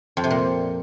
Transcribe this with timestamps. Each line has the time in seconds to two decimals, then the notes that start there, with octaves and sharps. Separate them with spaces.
0.17 F2
0.24 C3
0.31 A#2